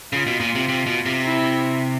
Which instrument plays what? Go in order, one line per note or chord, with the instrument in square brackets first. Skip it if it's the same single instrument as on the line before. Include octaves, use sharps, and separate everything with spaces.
[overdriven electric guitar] C#3 [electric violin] F4
[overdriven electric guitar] B2
A#2
C3
C3
B2
C3
[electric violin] E4